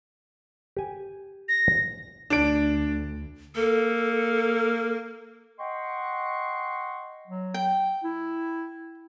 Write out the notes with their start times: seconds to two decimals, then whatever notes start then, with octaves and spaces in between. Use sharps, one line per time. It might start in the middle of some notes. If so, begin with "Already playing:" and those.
0.77 G4 G#5
1.49 A#6
2.30 D2 D4 D7
3.56 A#3 A4
5.59 D#5 F#5 G5 C6 C#6
7.27 F#3
7.54 G5
8.04 E4